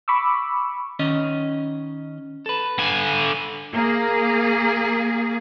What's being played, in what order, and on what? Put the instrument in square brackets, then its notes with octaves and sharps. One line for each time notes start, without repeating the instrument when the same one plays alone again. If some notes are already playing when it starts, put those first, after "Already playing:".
[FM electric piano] B5 C#6 D6 E6
[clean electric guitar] D#3 C#4 D#5
A4 B4
[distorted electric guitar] D3 G#5
[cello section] A#3 G#4